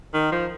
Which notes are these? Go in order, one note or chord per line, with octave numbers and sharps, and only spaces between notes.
D#3
F3